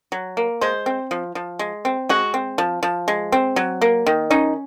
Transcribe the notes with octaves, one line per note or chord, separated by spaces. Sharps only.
F#3
A#3
G#3 C5
C4
F3
F3
G#3
C4
G#3 F#4
C4
F3
F3
G#3
C4
F#3
A#3
D#3
C#4 D#4